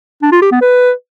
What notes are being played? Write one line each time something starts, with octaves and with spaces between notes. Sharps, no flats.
D4
F4
G4
B3
B4